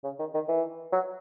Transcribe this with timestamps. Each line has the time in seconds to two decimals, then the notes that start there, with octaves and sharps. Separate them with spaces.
0.04 C#3
0.19 D#3
0.34 D#3
0.49 E3
0.92 F#3